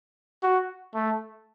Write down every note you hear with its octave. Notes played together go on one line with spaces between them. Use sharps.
F#4
A3